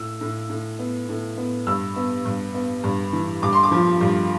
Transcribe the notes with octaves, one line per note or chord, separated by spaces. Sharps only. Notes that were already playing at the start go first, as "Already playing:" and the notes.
Already playing: A2 E6
A2
A2
B3
A2
B3
G2 E6
B3
G2
B3
G2
E3
G2 D6
C6
D6
F3
G2